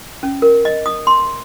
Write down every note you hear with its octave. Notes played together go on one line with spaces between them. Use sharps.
C#4
A#4
D#5
D#6
C6